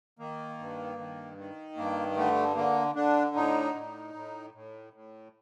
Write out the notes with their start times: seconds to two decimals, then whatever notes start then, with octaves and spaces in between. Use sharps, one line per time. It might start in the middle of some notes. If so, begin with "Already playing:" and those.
0.19 D#3 A#3
0.59 G2
0.98 D#3
1.38 D#3
1.77 G2 A#3
2.17 D3 A3
2.56 D3 A#3
2.95 D3 D4
3.35 A2 D#4
3.75 A2
4.14 A2
4.54 A2
4.93 A2